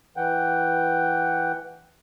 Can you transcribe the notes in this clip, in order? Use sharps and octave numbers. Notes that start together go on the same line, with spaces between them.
E3 F#5 G5